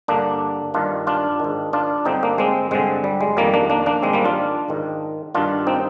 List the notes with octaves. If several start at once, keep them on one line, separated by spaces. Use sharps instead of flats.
G2 D3 A#3 D4
G2 D#3 D4 F4
D4 F4
G#2 D#3
D4 F4
G2 D3 C4 D#4
A#3 D4
G#3 C4
G2 D3 G#3 C4
G3
G#3
F2 D#3 G3 A#3
A#3 D4
A#3 D4
A#3 D4
G#2 D#3 G#3 C4
G3 A#3
D4 F4
G#2 D#3
G2 D#3 D4 F4
C4 D#4